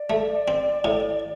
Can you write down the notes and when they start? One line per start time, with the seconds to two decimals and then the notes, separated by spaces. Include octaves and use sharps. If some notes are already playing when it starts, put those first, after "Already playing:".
Already playing: D5
0.10 A3
0.48 C4
0.84 A2